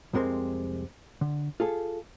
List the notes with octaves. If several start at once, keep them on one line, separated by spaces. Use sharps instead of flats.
C2 F2 C3 G#3 C4 A#4
D3
F4 G#4 A4